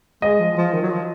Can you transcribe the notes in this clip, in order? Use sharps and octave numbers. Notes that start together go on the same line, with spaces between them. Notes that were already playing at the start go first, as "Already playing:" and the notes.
G#3 D#5
F3
F3
D#3
F#3
F3